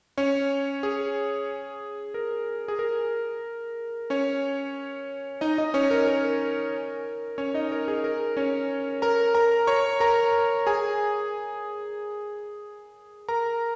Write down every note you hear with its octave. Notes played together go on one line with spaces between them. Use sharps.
C#4 C#5
G#4
A#4
G#4
A#4
C#4 C#5
D#4 D#5
D#4 D#5
C#4 C#5
A#4
A#4
C#4 C#5
D#4 D#5
A#4
G#4
A#4
C#4 C#5
A#4 A#5
A#4 A#5
C#5 C#6
A#4 A#5
G#4 G#5
A#4 A#5